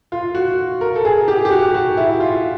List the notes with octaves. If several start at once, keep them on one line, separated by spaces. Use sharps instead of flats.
F4
F#4
A#4
A4
G#4
G4
G4
F#4
F#4
E4
F4